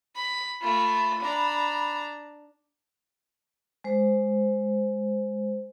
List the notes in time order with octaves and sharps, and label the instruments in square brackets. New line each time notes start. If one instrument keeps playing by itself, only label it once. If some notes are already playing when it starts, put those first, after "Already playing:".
[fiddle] B5
[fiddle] A3 F4 [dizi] B5
[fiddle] D4 A#5
[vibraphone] G#3 C5